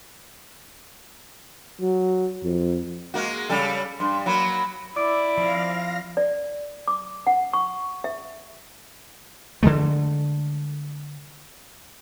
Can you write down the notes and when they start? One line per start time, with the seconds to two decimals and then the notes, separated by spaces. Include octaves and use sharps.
1.81 F#3
2.44 F2
3.14 G#3 A#3 F#4
3.49 C#3 G3 A4
4.00 G2 C6
4.26 F#3 A#3 B5
4.96 E4 D5 D6
5.38 F3 C4 F5 A#6
6.17 D5
6.88 D6
7.27 F#5
7.53 C#6
8.04 E5
9.63 D3 E3 G#3 A3